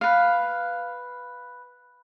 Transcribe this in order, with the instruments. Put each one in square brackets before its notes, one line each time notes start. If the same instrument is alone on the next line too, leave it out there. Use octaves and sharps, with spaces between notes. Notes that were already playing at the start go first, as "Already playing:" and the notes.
[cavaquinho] B4 F5